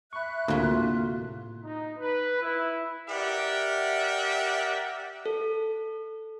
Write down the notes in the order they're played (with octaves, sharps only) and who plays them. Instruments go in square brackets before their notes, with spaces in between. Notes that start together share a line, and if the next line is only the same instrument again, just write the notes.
[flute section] E5 F#6 [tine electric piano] B5 C#6
[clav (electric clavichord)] D2 [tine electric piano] A2 C3 F#4 [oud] A#3 F4
[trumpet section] D#4
B4
E4
G4 A#4 D5 E5 F#5
[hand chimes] A4